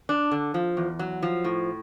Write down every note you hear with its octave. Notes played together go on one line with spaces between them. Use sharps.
D4
D3
F3
E2
F#3
F3
A2